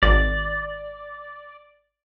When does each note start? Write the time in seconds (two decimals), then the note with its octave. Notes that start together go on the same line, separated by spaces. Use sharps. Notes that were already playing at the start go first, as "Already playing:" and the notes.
0.03 G#1 D5